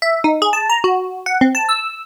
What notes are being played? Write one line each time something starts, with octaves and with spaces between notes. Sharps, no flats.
E5
D#4
G#4
A5
A#5
F#4
F#5
C4
A5
E6